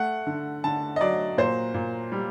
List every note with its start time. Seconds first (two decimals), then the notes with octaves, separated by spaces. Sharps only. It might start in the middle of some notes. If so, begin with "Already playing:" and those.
Already playing: A3 F#5
0.27 D3
0.64 D3 A5
0.96 D#5
1.01 F#3 D5
1.38 A#2 C5
1.74 A#2
2.12 G3